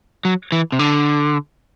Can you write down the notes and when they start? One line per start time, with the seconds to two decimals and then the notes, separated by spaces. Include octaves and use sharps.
0.25 F#3
0.52 E3
0.72 C3
0.79 D3